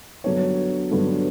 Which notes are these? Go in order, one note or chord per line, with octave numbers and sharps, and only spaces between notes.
G2 D3 F#3 B3 D4 C#5
G2 D3 F#3 B3 D4